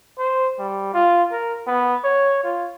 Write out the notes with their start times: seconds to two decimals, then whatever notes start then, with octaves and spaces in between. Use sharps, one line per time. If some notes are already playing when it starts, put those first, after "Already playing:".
0.19 C5
0.59 G3
0.94 F4
1.32 A#4
1.67 B3
2.04 C#5
2.44 F4